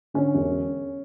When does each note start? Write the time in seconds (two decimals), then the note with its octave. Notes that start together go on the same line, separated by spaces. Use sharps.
0.14 D3 C#4
0.35 E1